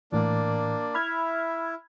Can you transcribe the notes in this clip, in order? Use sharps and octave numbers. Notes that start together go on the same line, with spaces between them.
A2 E3 A#3 D4 D5
E4 E5 B5 F6 G#6